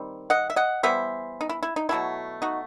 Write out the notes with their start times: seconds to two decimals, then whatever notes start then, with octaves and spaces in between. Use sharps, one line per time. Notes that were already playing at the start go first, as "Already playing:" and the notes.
Already playing: D#3 G3 C4
0.30 D#5 F#5
0.50 E5
0.56 D#5 F#5
0.83 E3 G3 B3 C5 E5
1.41 D#4
1.49 E4
1.63 E4
1.76 D#4
1.89 B2 F#3 A3 C4 E4
2.42 D#4 F#4